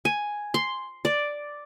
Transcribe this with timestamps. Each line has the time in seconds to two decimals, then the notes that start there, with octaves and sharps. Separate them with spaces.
0.05 G#5
0.54 C6
1.05 D5